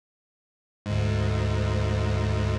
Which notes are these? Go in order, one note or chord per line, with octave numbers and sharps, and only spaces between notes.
D2 G#2